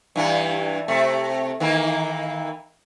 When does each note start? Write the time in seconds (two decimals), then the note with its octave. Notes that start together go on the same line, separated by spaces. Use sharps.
0.16 G2 E3
0.88 C3 A3
1.60 D#3 E3 A#3